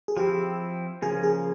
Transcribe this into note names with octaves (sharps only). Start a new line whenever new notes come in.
G#4
F3 C4 E4 G4
C#3 F3 A#3 C#4 G#4
G#4